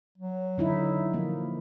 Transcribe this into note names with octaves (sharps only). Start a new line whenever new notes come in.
F#3
D3 D#4 E4
F3 A#3